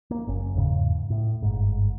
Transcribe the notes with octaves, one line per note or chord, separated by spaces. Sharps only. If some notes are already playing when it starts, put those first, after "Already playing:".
A#3
F#1 C#4
E2 G#2 C#3
A2
G1 G#2